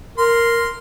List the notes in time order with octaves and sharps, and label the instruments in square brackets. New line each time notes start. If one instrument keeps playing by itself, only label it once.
[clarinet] A#4 [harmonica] C6